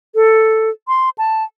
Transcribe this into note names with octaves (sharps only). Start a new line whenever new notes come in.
A4
C6
A5